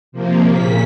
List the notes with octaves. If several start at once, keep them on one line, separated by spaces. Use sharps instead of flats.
C3 F3 A#3
A#2 C#3 B6